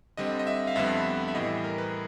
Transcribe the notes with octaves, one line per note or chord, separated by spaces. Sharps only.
D3 G3 C4 D#5
D#5
E5
F5
F2 D3 G3 B3 E5
E5
A2 E3 G3 D#5
A#4
B4